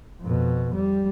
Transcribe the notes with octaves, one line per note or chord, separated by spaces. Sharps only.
F2 B2
G3